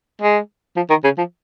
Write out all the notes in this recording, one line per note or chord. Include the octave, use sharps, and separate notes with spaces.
G#3
F3
D#3
C#3
F3